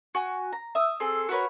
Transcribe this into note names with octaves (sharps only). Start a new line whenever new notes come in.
F#4 G#5
A#5
E5 D#6
C4 G#4 A4
F#4 A#4 B4 C#5